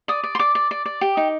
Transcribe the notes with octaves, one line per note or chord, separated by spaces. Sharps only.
D5 D#6
D5
C6
D5 D6
D5
D5
D5
G4
D#4